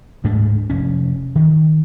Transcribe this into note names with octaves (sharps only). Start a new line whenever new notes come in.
D2 G#2 A3 D4
F1 C#4
D#3